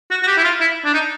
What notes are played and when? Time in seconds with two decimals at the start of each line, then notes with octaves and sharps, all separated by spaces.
0.11 F#4
0.23 F#4
0.27 G4
0.37 E4
0.44 F4
0.60 E4
0.85 D4
0.94 D#4